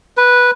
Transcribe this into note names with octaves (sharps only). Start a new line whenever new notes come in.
B4